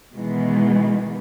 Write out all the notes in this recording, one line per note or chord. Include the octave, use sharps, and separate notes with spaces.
B2 D#3 E3 G#3 B3